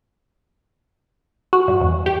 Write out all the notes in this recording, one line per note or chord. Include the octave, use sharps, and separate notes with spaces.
F#4
G2
E2
G4